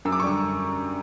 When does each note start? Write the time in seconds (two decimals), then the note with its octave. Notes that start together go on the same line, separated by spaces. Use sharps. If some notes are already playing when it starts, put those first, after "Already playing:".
0.05 F#2 E6
0.12 D6
0.20 C#6
0.23 D3 G3 D6